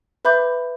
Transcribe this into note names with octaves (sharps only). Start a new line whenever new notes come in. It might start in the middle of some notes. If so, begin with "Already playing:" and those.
B4 E5 B5 D6 G6